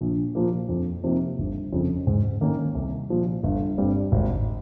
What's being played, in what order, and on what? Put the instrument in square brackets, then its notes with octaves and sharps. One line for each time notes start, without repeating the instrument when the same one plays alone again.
[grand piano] A#1
A#2 F3 A#3
F2
C3 F3 A#3 D#4
G1
F2 C#3
G#2
D#3 A#3 C#4
C2
A#2 F3
G1
G2 G3 C4
G#1